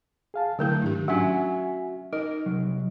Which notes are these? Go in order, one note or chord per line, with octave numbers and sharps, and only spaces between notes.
G#4 F5 A5
D3 F#3 A3 E4 A#4 G6
G#2 D#3 D4 G4
F#3 C#4 D4 F#4 E5 F#5 G#5
D#4 A#4 D#5
C2 F#3